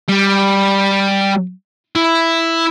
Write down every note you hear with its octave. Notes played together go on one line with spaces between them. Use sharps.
G3
E4